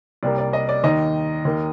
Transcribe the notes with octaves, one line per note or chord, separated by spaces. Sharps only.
C2 C3 G3 A#3 D5
D5
D#5
D5
D#2 D#3 A#3 D#5
D#2 D#3 A#3